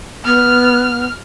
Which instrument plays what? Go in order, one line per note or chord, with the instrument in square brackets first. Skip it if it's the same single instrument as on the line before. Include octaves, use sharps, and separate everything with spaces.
[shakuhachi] B3 [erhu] F6